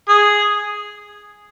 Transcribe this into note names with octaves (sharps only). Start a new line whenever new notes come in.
G#4